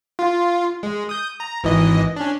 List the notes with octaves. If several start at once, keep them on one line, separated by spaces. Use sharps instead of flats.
F4
G#3
D#6 G6
A#5
G#1 E3 D#5
C#4 D4